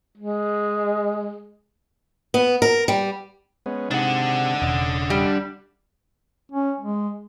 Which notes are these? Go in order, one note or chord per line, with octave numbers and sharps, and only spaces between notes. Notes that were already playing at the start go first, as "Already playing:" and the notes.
G#3
B3
A#4
G3
G#3 B3 C#4
G#2 C3 G#3 D4 F#5
E1 C#3 D#5
G3
C#4
G#3